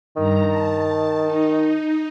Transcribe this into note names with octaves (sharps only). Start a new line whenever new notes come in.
G2 D#3 A#5
A5
D#4